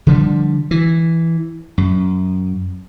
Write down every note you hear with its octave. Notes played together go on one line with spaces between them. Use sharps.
D3 F3 G3
E3
F#2